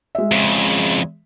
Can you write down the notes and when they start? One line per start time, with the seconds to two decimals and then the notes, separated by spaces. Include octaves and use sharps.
0.15 G#3 E5
0.31 F2 C#3